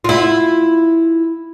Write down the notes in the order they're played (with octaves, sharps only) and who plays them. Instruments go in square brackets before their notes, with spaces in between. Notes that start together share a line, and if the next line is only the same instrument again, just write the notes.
[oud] E4 F4